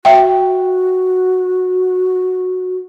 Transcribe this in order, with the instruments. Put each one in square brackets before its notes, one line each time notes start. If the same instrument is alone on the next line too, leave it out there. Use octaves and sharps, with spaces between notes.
[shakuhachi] F#4 [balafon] E5 G5